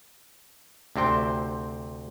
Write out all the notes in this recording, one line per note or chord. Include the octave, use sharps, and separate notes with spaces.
D2 C3 C4 G5